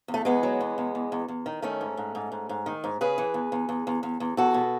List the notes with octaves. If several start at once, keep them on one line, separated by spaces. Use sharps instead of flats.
E2
A3
E2 G#3 B3
F#3
E2
E2
E2
E2
E2
D#3
D#3 A3 C#4
G#2
G#2
G#2
G#2
G#2
D#3
G#2
C#3 G#4 B4
E3
E2
E2
E2
E2
E2
E2
E2 F#4 A4
B2